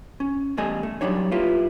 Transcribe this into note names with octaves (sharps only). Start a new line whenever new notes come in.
C#4
E2 G3 A3 A4 D#5 G#5
A3
F#2 F#3 G3 D4 D#4 C#5
A#3 E4 F4 G4 B4